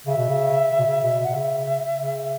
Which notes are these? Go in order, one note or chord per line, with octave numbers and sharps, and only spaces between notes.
C#3 E5
B2
C#3
C#3
B2
C#3
B2
B2 F#5
C#3 E5
C#3